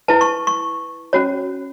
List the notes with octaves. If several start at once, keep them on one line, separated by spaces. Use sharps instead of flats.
E4 B4 A5
C#6
C#6
C#4 F#4 C#5